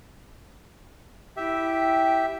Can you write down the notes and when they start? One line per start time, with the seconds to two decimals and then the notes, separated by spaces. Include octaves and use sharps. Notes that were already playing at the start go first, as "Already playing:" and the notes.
1.37 E4 G4 E5 G5